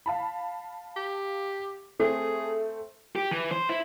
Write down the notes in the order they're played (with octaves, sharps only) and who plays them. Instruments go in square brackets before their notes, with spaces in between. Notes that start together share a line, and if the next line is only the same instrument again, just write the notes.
[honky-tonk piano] F5 A5 B5
[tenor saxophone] G4
[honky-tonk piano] A3 C4 [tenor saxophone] G#4
[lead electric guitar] G4
E3
C5
E4